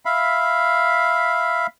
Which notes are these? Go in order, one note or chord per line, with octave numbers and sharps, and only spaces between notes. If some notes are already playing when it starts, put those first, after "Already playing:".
E5 F5 B5